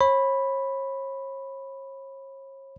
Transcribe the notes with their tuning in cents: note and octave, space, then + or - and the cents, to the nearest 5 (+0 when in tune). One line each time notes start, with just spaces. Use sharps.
C#5 -40 B5 +0